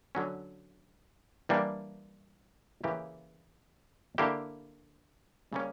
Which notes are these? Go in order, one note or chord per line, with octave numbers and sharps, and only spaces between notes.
D3 F#3 C#4
E3 G3 A#3 D4
C#3 E3 A#3 E4 G4
D3 A#3 E4 G4
C#3 G3 A#3 C#4